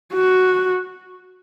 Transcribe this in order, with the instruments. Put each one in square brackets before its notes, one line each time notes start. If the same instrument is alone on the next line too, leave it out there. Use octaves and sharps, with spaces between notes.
[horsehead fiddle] F#4